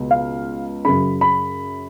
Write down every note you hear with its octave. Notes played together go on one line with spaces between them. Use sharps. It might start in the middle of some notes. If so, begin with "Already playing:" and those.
Already playing: C#2 B2
F5
F#2 C#3 B5
B5